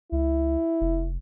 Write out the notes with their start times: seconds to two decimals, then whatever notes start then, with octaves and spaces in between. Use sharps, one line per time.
0.12 C#2 E4
0.81 F1